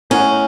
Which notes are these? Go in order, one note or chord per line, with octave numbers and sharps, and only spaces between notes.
A3 C#4 E4 C#5 F#5